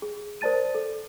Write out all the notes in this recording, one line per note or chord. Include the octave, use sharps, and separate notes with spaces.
G#4
A#4 C5 D5 A5 A6 D#7
A4